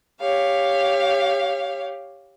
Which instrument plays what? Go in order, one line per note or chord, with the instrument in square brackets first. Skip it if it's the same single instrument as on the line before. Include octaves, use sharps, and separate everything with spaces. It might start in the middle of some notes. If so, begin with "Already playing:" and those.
[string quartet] G4 C#5 F5